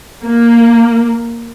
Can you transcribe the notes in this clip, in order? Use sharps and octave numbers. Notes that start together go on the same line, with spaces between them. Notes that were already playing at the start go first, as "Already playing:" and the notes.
A#3